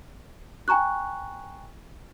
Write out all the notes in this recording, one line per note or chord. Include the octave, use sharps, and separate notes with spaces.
G5 G#5 A#5 C#6 F#6